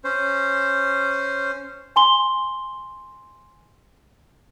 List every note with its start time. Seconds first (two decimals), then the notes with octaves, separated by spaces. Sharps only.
0.04 C#4 C5
1.96 G#5 C6 G7